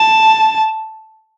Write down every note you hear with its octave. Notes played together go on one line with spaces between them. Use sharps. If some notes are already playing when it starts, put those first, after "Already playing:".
Already playing: A5